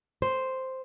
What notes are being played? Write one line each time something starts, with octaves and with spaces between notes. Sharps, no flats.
C5